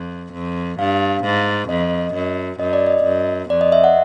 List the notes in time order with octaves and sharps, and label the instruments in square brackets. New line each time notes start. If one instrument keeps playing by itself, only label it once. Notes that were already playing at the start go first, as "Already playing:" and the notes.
Already playing: [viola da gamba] F2
F2
[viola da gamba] G2 [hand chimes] F5
[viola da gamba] G#2
[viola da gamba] F2 [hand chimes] D#5
[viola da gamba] F#2
[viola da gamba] F#2 [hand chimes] D#5
[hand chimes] D5
D#5
[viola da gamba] F#2
[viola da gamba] F2 [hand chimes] D5
[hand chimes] D#5
E5
F#5